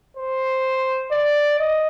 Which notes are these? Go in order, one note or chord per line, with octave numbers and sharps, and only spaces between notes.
C5
D5
D#5